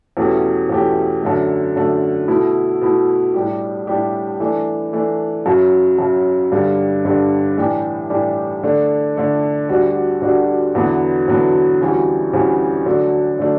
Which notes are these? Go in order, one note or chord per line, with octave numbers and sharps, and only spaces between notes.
E2 B2 A3 C#4 G4
E2 B2 A3 C#4 G4
F#2 D3 A3
F#2 D3 A3
B2 A3 E4
B2 A3 E4
A2 G3 D4 G4
A2 G3 D4 G4
E3 A3 D4
E3 A3 D4
F#2 C#3 F#3
F#2 C#3 F#3
G2 D3 G3 D4
G2 D3 G3 D4
A2 E3 G3 D4 G4
A2 E3 G3 D4 G4
D3 A3 D4
D3 A3 D4
D2 D3 G3 D4 F#4
D2 D3 G3 D4 F#4
E2 D3 F#3 B3 F#4
E2 D3 F#3 B3 F#4
D2 C#3 E3 G3
D2 C#3 E3 G3
D3 F#3 A3 D4
D3 F#3 A3 D4